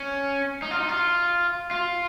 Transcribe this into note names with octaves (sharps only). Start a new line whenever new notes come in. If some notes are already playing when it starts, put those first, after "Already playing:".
Already playing: C#4
D#4
F4
D#4
F4
F4